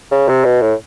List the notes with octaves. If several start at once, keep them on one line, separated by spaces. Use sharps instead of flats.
C#3
C3
B2
A2